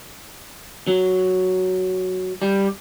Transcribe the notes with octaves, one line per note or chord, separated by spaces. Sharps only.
F#3
G3